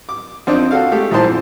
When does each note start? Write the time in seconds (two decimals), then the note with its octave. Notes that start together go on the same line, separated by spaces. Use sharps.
0.09 D6
0.47 F2 C4 D4 D#4
0.71 F#4 A4 F5
0.91 G#3 A3 G4
1.11 A#1 G#2 E3 C5 A5
1.24 F2